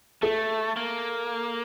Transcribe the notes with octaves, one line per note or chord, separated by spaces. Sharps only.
A3 A4
A#3